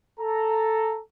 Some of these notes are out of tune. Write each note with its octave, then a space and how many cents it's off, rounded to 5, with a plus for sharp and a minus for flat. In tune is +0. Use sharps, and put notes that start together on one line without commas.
A4 +0 A#5 -10